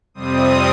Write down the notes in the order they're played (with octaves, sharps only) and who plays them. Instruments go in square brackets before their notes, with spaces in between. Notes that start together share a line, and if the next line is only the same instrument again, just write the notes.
[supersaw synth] F2 C3 G3 C4 D#6